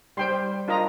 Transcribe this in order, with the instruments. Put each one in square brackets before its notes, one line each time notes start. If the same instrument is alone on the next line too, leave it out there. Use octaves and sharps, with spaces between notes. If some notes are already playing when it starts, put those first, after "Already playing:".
[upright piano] G3 [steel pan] C5 G5 C6
[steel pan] D4 F4 A#4 D#5 A#5